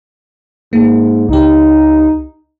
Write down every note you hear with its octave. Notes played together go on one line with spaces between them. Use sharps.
G#2 A#3
C#2 D#4 G4